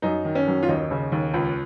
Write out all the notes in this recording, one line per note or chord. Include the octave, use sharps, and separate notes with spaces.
F#2 D#4
D#3
C#4
F#2
F4
D#2 D#4
C#3
D#2
C#2